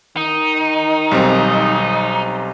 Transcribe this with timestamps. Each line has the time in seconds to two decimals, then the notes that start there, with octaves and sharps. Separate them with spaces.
0.17 D#3 D#4
1.11 B1 G3 C4